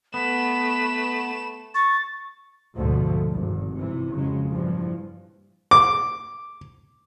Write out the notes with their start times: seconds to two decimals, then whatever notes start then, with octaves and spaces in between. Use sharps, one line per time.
0.14 A3 B3 B5 E7
1.75 C#6 A6
2.76 D2 G#2 B2 D3 F3 A3
3.31 G#1 G2
3.76 C3 E3
4.15 F2 C#3 F#3 G#3
4.50 G2 A#2 E3 F3
5.71 D6